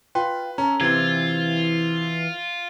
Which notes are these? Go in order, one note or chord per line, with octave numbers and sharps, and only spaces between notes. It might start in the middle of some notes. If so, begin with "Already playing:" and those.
F4 B4 G5 C6
C#4 A4 A#5
C3 E3 C4 F4 G#6